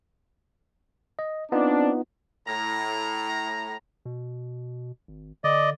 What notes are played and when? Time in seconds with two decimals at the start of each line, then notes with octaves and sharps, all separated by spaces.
1.19 D#5
1.52 B3 C4 D4 D#4 F4
2.47 A2 A#5
4.05 B2
5.08 G#1
5.44 D3 D5 D#5